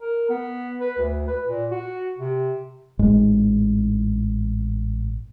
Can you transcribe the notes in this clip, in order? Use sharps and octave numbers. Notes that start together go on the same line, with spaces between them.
A#4
B3
B4
D2
B4
A#2
F#4
C3
A1 G#2 G#3